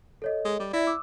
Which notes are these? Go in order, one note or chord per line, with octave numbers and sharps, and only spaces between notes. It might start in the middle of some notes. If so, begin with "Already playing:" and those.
A4 C#5 D#5
G#3
G3
E4 D5 E5
D6 E6